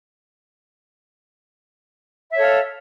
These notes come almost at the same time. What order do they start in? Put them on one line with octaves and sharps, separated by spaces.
E5 C#5 A4 F5